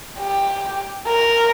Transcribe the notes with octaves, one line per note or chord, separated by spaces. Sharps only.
G4
A#4